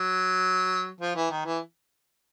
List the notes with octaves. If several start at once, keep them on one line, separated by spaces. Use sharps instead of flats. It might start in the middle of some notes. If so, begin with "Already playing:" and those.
Already playing: F#3
F3
E3
D#3
E3